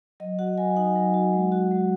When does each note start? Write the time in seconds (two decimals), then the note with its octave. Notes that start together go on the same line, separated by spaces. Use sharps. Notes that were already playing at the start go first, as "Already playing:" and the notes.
0.20 F#3 D#5
0.39 F#4 F#5
0.58 F#3 G#5
0.76 D#4 F#5
0.95 F#3
1.14 F#4
1.33 G#3
1.52 F#4
1.71 G#3